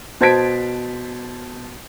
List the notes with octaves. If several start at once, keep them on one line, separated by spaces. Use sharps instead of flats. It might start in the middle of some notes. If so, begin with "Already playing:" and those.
B2 C5 A5 G#6 B6 D7